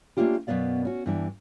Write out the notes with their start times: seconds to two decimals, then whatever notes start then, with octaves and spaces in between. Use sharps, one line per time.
0.17 A3 A#3 C#4 D4 F4 G4
0.47 F#2 B2 A3 B3 D5 F5
0.85 C#4 F#4
1.06 G2 E3 D4